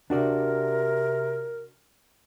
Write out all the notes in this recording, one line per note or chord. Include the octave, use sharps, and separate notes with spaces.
C3 D4 F#4 A#4 D5